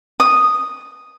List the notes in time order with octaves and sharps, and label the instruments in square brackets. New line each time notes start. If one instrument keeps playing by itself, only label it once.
[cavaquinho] D#6